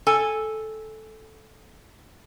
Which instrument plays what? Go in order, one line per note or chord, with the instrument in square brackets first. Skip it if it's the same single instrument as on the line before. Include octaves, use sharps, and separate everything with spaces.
[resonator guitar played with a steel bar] A4 G#5